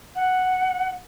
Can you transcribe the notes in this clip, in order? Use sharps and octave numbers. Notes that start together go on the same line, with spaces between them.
F#5